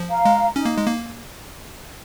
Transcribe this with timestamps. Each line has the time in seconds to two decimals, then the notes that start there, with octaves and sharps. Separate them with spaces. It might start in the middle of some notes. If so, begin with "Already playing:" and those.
Already playing: F3
0.10 F5 A#5
0.25 G#3
0.56 C#4 D#4
0.65 A#3
0.77 G#3
0.86 A#3